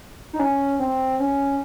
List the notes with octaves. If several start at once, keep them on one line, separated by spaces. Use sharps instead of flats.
D#4
C#4
C4
C#4